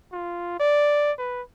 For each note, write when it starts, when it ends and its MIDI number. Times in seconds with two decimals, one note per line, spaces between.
0.12 0.59 65
0.60 1.12 74
1.18 1.42 71